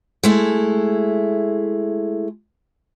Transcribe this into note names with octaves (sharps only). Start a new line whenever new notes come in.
G#3 A3 E4